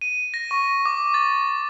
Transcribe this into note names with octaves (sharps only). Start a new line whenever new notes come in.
D#7
A#6
C#6
D6
A6